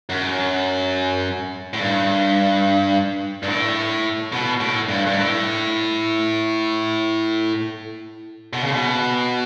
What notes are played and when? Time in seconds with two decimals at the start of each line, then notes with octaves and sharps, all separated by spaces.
0.10 F#2
1.74 A2
1.79 G2
3.43 G2
3.47 A2
4.32 B2
4.60 A2
4.89 G2
5.06 G2
5.16 A2
8.53 B2
8.63 C#3
8.72 B2